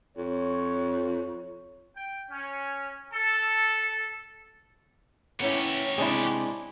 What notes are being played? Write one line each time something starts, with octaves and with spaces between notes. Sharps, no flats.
F2 C#5
G5
C#4
A4
B3 C#4 E4 G4 C#5
C3 G#3 D4 E4